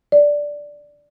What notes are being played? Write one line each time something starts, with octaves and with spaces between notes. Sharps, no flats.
D5